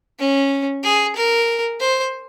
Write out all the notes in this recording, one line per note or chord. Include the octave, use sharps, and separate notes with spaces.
C#4
G#4
A#4
C5